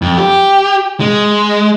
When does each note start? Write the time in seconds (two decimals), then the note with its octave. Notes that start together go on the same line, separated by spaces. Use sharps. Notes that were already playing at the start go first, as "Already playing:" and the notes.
0.02 F2
0.18 G4
1.00 G#3